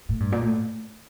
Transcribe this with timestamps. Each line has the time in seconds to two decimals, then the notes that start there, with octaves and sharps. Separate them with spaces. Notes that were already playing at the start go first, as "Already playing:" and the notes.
0.09 A2
0.20 G2
0.32 A#2
0.42 A2